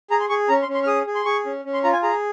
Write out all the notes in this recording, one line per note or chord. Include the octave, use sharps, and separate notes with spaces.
G#4 A#5
C6
G#4 C#6
C#4 A#5
C6
C#4
C6
F6
G#4 D#6
G#4
C6
G#4 C#6
C#4
C#4
C6
F4 A#5
G#5
G#4 A#5